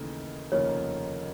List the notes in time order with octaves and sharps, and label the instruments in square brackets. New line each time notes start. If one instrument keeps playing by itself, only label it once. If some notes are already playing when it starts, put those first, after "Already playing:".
Already playing: [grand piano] D#2 C#3 E3 A3
[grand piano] F1 D#2 C#3 F3 A#3 [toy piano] C#5